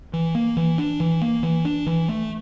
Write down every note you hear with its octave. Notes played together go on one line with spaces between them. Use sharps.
E3
A#3
E3
D4
E3
A#3
E3
D4
E3
A3